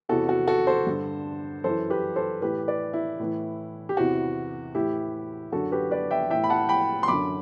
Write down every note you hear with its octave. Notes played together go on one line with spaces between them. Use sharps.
E2 C3 E3 F#4 A4
F#4 A4
F#4 A4
A4 C5
G2 D3
F#2 E3 A4 C5
G4 B4
A4 C5
A2 E3 G4 B4
B4 D5
E4
A2 E3
G4
E2 C3 E3 F#4
A2 E3 E4 G4
F#2 D3 F#4 A4
G4 B4
B4 D5
E5 G5
A2 E3 E5 G5
B5
F#5 A5
G5 B5
C6
F#2 D3 B5 D6